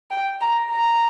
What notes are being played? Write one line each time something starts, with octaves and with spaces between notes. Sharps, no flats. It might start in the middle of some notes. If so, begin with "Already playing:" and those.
G5
A#5
A#5